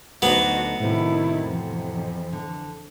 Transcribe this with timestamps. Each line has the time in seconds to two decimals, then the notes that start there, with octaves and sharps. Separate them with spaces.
0.22 D2 D3 F#3 B3 D#4 F#4
0.79 A2 C3 D#3 E4
1.46 F2 E3
2.32 D3